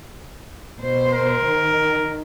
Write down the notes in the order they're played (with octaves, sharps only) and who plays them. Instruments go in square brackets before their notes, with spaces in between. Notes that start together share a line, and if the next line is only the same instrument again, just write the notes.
[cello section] B2 C5
[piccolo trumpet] A#4
[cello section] D#3